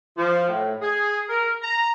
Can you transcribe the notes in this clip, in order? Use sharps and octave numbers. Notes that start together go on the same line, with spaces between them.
F3
A2
G#4
A#4
A#5